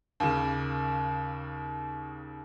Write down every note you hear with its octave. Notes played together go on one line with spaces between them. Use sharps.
D#2 C#3